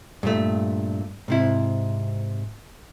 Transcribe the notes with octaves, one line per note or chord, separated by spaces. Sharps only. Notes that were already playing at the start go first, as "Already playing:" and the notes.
G2 A#2 A3
G#2 C3 E4